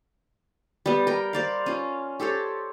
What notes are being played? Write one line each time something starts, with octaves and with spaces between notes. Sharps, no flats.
G3 B3
A#4 G5
C5 D5 F5
C#4 F4
G4 A4 C5 C#5